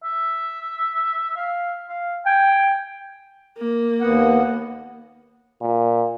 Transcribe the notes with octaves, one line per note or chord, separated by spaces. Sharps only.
E5
F5
F5
G5 G#5
A#3
D#2 B3 F#5
A#2